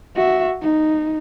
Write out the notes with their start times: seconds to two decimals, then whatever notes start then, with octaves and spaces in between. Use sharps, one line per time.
0.15 F#4 E5
0.62 D#4